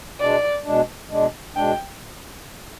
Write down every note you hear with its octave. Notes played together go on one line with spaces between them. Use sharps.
B2 G#3 D4 D5
B2 G#3 D4
B2 G#3 D4
B2 G#3 D4 G5